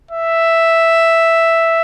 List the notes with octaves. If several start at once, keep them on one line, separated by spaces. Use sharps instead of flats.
E5